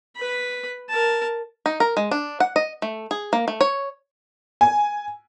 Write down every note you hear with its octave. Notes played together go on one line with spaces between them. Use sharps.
B4 B5
A#4 A5
D#4
A#4
G#3
D4
F#5
D#5
A3
G#4
A#3
A3
C#5
G#5